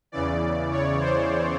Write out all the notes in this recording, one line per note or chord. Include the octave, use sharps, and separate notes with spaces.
E2 C#3 E3 D5
C#5
C5